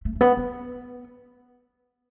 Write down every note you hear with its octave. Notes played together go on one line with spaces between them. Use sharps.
A3
A3
B3
B3